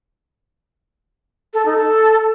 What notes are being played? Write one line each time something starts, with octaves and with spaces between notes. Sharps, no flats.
A4
D#4
A4